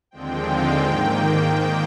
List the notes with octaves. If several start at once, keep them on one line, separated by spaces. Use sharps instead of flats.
D#2 D3 F3 G#3 C4 G5
F5
G#2 D#3 A#3 G5